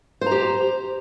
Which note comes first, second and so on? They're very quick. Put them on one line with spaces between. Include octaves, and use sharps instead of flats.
C5 A#5 G4